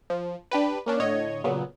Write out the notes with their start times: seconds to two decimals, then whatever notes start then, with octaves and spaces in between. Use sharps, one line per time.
0.10 F3
0.51 D4 G4 B4
0.86 A#3 C#4 D4
1.00 A2 D3 C#5 D#5 G#6
1.44 A#2 C#3 F#3 B3